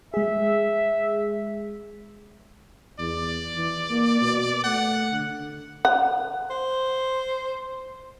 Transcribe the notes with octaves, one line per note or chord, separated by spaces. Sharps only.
G#3 G#4 E5
E2 D5
E3
A#3
B2
A3 F#5
D3
F#5
C5